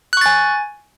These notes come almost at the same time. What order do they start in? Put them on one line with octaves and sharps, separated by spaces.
F#6 C#6 A6 G#5